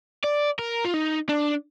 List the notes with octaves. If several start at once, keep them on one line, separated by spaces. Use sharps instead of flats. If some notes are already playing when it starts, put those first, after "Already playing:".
D5
A#4
F4
D#4
D4